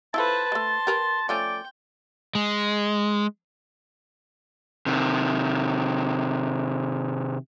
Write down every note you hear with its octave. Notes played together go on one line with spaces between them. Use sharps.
E4 F4 A4 B4 C5 A5
G#3 A3 C6
G4 A#4 B4
F3 A3 C#4 D5 G5
G#3
C3 D#3